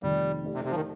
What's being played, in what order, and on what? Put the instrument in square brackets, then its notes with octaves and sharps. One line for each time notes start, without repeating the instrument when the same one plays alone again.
[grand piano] F2 C3 D#3 A3 [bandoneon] G3
[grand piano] A3 D#4 G4 D5
[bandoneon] C3
C3
F3
D#3